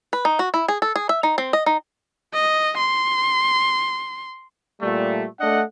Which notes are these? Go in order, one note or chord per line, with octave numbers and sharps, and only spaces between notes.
B4
D#4
F#4
E4
G#4
A4
G#4
E5
D#4
C4
D#5
D#4
D#5
C6
A#2 G3 A3
A3 D4 D#5 F#5